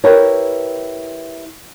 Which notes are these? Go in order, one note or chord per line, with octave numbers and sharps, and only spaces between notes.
E4 G4 A#4 B4 C#5